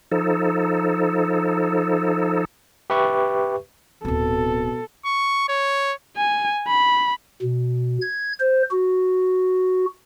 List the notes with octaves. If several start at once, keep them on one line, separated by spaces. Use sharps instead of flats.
F3 D#4 A4
G4 B4 E5 C#6
D1 B2 C4 A4
C#6
C#5
G#5
B5
B2
G#6
C5
F#4